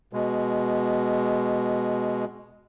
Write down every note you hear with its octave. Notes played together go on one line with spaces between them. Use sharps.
B2 G#3